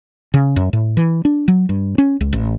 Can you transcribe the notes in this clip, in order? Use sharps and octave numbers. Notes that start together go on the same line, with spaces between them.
C#3
F#2
A2
E3
D4
F#3
G2
C#4
C#2
A1